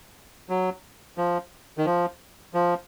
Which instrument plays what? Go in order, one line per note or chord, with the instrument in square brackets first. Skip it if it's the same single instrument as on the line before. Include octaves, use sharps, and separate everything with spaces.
[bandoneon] F#3
F3
D#3
F3
F3